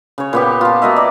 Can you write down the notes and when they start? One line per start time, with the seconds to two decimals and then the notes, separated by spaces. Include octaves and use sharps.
0.18 C#3 C#5
0.33 A#2 B3 G4
0.61 F4 A5
0.82 A#3 F#4 D#5 E5
0.96 D5